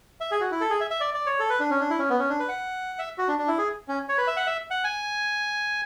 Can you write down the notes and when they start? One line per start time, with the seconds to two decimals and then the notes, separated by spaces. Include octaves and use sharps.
0.21 E5
0.31 G#4
0.40 F#4
0.51 E4
0.61 A4
0.70 G#4
0.81 E5
0.91 E5
1.01 D5
1.14 D5
1.26 C#5
1.39 A4
1.50 B4
1.60 D4
1.70 C#4
1.80 D4
1.90 E4
1.99 C#4
2.10 B3
2.19 C#4
2.30 D4
2.40 B4
2.49 F#5
2.99 E5
3.18 F#4
3.28 D4
3.39 D4
3.48 E4
3.58 G#4
3.88 C#4
4.09 C#5
4.18 B4
4.27 E5
4.37 F#5
4.47 E5
4.71 F#5
4.84 G#5